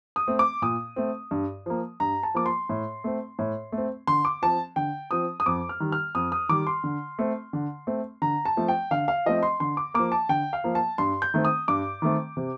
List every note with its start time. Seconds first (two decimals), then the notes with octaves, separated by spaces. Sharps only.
0.16 D#6
0.28 A3 C4
0.39 D6
0.62 A#2 D#6
0.96 A3 C4
1.31 G2
1.66 F3 A#3
2.00 G2 A#5
2.23 A5
2.34 F3 A#3 D6
2.46 C6
2.69 A2
3.04 A3 C4
3.39 A2
3.72 A3
3.78 C4
4.07 D3 C6
4.25 D6
4.42 F3 C4 A5
4.76 D3 G5
5.11 F3 C4 D#6
5.40 D#6
5.46 F2 D6
5.69 F6
5.80 D#3 G3
5.92 F6
6.15 F2 D#6
6.32 D#6
6.49 D#3 G3 D6
6.67 C6
6.84 D3
7.19 A3 C4
7.53 D3
7.87 A3 C4
8.22 D3 A#5
8.45 A5
8.57 F3 A3 C4
8.68 G5
8.91 D3 F5
9.08 F5
9.26 F3 A3 C4 D#5
9.43 C6
9.60 D3 C6
9.77 D6
9.94 F3 A#3 D6
10.12 A5
10.29 D3 G5
10.53 F5
10.64 F3 A#3
10.75 A5
10.98 G2 C6
11.22 G6
11.34 D#3 A3 C4
11.45 D#6
11.68 G2 D6
12.02 D#3 A3 C4
12.37 C3